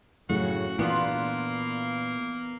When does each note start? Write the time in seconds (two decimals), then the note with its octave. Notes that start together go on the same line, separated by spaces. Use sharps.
0.30 F#2 A2 C#3 F#4
0.79 A#2 E3 A#3 B3 D4 F4